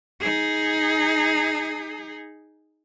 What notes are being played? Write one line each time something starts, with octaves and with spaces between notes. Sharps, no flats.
D#4 G#4